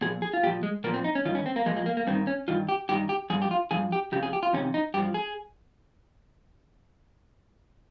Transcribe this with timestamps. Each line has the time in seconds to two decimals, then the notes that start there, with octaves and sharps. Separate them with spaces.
0.01 A#2 F3 G#4
0.22 G#4
0.34 F4
0.43 A#2 G4
0.47 F3
0.63 G#3
0.84 A#2 F3 A#3
0.94 C4
1.04 D#4
1.15 C#4
1.25 G2 D#3 F4
1.35 C#4
1.46 C4
1.56 A#3
1.66 A#2 F3 G#3
1.76 G#3
1.86 A#3
1.97 A#3
2.07 G2 C4
2.10 D#3
2.27 C#4
2.48 G2 D#3 F4
2.69 G4
2.89 G2 D#3 G4
3.09 G4
3.30 G2 F3 G#4
3.42 G4
3.51 F4
3.71 G2 F3 G#4
3.92 G4
4.12 F2 C#3 G4
4.23 G#4
4.33 G4
4.43 F4
4.53 F2 C3 D#3 C#4
4.74 D#4
4.94 G2 G4
4.99 F3
5.14 G#4